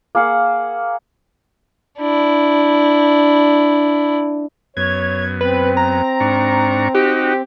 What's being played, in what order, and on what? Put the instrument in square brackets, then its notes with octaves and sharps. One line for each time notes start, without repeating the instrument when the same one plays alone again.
[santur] A#3 G#4 F5 F#5
[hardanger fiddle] D4 E4
[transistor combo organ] F#2 B3 [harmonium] C#5 [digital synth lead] G#6
[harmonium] C4 [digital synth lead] B4
[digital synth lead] A#5
[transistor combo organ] G#2 D4 C#6
[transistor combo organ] D#4 F#4 [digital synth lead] G4